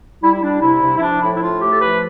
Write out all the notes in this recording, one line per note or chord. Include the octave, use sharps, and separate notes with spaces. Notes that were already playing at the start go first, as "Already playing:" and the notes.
G3 E4
E4
G3 D4
C3 E4
C3
E4
F3 D4
A2 E4
E4
A2 F4
A3 G4
A4
F3 B4